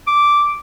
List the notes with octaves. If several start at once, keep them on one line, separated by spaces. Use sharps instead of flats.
D6